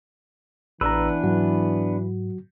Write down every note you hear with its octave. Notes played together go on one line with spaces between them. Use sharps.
A1 E3 B3 D4 B4 A#5 E6
G#2 F#3 F#4